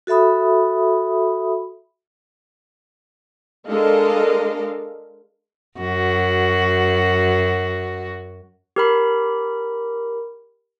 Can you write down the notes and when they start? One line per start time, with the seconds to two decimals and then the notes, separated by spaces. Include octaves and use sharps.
0.07 F#4 A4 E5 B5 D#6
3.68 G#3 D4 A4 A#4 D#5 F5
5.79 F#2 F#4
8.76 G4 A#4 B5